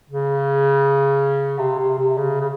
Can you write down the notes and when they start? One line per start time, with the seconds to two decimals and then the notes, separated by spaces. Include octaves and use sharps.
0.10 C#3
1.58 C3
1.79 C3
1.98 C3
2.18 C#3
2.40 C#3